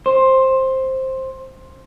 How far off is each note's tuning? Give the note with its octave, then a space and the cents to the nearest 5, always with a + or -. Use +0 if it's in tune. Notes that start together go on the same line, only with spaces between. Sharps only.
C5 +10